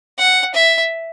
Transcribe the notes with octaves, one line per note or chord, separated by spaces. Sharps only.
F#5
E5